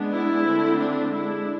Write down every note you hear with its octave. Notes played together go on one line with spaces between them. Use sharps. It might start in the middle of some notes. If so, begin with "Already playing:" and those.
Already playing: G#3 B3 D4
E4
D3 A3 C4
D4
G#3 D4 E4